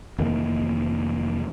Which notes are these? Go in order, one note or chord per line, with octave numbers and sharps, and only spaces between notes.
F1 D#3 E3 A#3